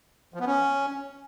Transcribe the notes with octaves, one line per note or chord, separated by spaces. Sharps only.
F3
B3
C#4